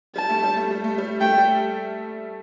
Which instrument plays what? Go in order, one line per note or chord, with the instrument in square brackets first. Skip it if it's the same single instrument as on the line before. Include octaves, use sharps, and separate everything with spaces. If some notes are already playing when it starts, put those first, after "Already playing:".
[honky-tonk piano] G3 [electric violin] A5
[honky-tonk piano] A3
G3
A3
G3
A3
G3
[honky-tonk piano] A3 [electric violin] G5
[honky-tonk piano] G3